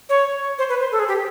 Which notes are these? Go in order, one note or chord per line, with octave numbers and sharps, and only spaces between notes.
C#5
C5
B4
C5
A4
G#4
G4